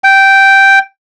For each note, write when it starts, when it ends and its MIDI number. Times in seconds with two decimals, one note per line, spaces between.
0.04 0.79 79